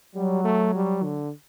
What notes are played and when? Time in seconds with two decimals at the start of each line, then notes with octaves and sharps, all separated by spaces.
0.16 F#3 G3
0.45 A3
0.75 G3
1.04 D3